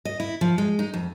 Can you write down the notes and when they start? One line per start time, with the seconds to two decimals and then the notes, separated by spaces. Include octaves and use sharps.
0.05 D#5
0.20 E4
0.41 F3
0.58 G#3
0.79 D#4
0.94 F2